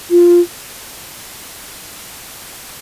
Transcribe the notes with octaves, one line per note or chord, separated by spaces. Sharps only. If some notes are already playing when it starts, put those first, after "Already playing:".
F4